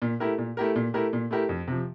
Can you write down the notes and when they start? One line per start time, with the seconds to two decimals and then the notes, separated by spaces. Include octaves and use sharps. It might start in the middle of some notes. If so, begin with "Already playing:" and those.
0.02 A#2
0.20 A3 E4 G4 A#4
0.38 A#2
0.57 A3 E4 G4 A#4
0.75 A#2
0.94 A3 E4 G4 A#4
1.13 A#2
1.31 A3 E4 G4 A#4
1.49 F2
1.68 C3 F3